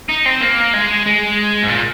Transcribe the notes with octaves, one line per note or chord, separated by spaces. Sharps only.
D#4
C4
A#3
G#3
G#3
G#2
A#2